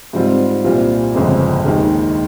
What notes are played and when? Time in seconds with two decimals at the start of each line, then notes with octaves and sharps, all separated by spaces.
0.13 G#2 G3 C4 F4
0.64 C2 A#2 G3 C4 F4
1.15 G1 F2 C#3 G#3 C4
1.66 D#2 D#3 G#3